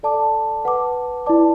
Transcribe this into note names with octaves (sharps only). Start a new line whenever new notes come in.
A4 D5 A5 D6
B4 F#5 A5 D6
E4 B4 D5 A5 D6